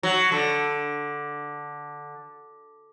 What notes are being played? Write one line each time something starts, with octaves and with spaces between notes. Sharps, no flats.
F#3
D3